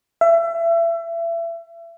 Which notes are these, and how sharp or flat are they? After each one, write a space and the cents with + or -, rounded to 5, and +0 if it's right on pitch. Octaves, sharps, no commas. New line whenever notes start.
E5 +30